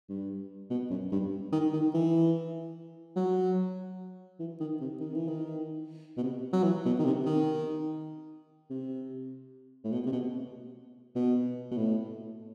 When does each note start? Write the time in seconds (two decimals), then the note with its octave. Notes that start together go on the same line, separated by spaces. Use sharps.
0.09 G2
0.70 B2
0.90 F#2
1.12 G2
1.52 D#3
1.73 D#3
1.94 E3
3.16 F#3
4.40 E3
4.60 D#3
4.81 C3
5.00 D#3
5.14 E3
5.28 D#3
6.17 B2
6.23 C3
6.53 F#3
6.64 E3
6.86 B2
6.99 D#3
7.05 C3
7.26 D#3
8.70 C3
9.84 A2
9.92 B2
10.06 C3
10.12 B2
11.15 B2
11.71 B2
11.77 A2